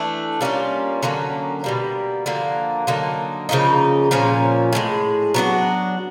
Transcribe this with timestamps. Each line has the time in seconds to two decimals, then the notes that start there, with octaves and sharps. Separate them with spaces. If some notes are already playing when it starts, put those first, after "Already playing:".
Already playing: E3 A3 D4
0.41 G3 A#3 C#4 F4
1.03 D3 F#3 A#3 C#4
1.64 B2 G3 A#3
2.26 D3 F3 A#3
2.87 D3 F#3 A#3 D#4
3.49 C#3 F3 A#3 D#4
4.11 A#2 F3 A#3 C#4
4.73 A2 F3 G#3
5.34 F#3 B3 D4 F#4